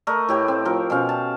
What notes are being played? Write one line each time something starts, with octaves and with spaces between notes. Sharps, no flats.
A3 A#4 D#5
A2 G4 B4
C4
F3 A#4
B2 C#4 F5
A5